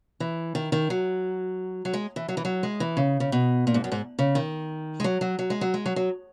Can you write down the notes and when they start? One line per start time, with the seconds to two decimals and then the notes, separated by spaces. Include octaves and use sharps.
0.20 E3
0.55 D#3
0.72 D#3
0.90 F#3
1.85 F#3
1.93 G#3
2.16 E3
2.28 F#3
2.37 E3
2.45 F#3
2.63 G#3
2.80 E3
2.97 C#3
3.20 C#3
3.32 B2
3.67 A#2
3.74 G#2
3.84 F#2
3.92 G#2
4.19 C#3
4.35 D#3
5.00 G#3
5.04 F#3
5.21 F#3
5.39 F#3
5.50 G#3
5.61 F#3
5.74 G#3
5.86 F#3
5.96 F#3